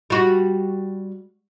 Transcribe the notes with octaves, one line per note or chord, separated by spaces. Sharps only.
G3 F#4